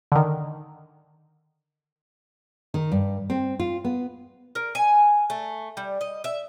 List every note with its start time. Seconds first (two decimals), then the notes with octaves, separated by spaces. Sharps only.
0.12 D3 D#3
2.74 D#3
2.92 G2
3.30 C4
3.60 F4
3.85 B3
4.55 A#4
4.75 G#5
5.30 A3
5.77 G3
6.01 D#5
6.24 E5